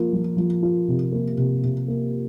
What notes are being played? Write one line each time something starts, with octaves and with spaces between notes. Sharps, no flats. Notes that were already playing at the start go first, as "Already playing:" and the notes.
Already playing: F3 A#3 F4
F3
F3
F4
C3
A#3
C3
C3
A#3